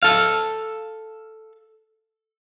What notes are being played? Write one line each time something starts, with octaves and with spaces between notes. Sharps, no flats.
A4 F5